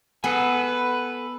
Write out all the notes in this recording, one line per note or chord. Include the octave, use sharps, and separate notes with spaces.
B3 A4 B4 G#5